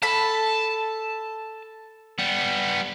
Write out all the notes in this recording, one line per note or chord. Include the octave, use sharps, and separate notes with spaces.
A4 A5 B5
G3 B3